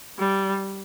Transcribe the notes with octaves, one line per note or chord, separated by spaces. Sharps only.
G3